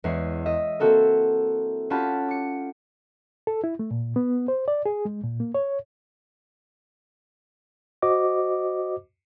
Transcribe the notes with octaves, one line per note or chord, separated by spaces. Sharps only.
E2 G#3 E4 C#5 C7
D#5 E5
A#3 C4 E4 F#4 A4 A#4
C#4 F4 G4 F#5 A5 B5
D6 C#7
A4
E4
A3
A#2
B3
C5
D5
G#4
G#3
A#2
A#3
C#5
F#4 C5 D#5 D6